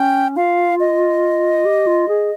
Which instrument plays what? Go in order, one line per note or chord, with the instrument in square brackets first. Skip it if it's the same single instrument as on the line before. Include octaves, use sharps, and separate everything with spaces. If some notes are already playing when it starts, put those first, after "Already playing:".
Already playing: [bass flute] C#4 [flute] G5
[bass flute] F4 [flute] F5
[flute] D#5
[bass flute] G4
F4
G#4